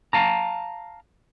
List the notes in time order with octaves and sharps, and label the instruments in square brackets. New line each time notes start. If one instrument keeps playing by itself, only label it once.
[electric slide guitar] F5 A5 A#5